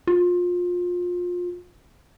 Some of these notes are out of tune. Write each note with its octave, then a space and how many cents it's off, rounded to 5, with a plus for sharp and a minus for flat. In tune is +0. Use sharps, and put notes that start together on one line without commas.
F4 +25